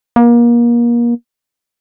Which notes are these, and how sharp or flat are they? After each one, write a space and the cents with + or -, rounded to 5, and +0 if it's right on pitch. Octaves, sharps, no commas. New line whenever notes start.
A#3 +30